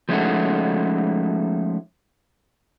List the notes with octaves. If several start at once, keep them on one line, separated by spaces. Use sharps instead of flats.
F3 G#3 A3 C#4 D#4 F#4